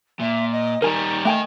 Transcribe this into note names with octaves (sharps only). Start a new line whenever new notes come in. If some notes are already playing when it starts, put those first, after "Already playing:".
A#2 E5
D#5
D#3 G3 D#4 A#4 G#5
A3 A#4 D#5 G5 G#5